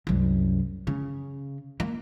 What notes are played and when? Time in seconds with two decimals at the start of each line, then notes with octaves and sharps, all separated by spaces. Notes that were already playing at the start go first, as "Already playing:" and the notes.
0.07 C2 F#2
0.87 C#3
1.80 A#3